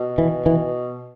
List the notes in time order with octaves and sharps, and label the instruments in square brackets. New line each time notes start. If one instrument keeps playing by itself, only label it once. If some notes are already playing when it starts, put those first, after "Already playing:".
Already playing: [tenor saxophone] B2
[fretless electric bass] E3
E3